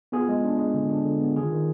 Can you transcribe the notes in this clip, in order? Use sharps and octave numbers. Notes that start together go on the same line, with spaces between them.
B3 F4 G#4
G#3
D4
G#3
D3
D4
D3
B3
D#3 F4 G#4
D#3